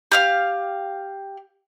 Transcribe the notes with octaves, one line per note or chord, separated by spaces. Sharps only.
G4 F5 F6